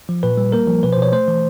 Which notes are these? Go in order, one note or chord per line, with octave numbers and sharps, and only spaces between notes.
F3
A#2 B4
G3
A#3 A#4
F3
B2 B4
C5
B2 C#5
A3 C5
E3